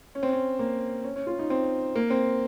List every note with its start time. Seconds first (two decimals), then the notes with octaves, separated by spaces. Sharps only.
0.15 C#4
0.23 C4
0.32 C#4
0.59 A#3
1.04 C#4
1.16 C#4
1.27 F4
1.39 D#4
1.50 C4
1.96 A#3
2.10 C4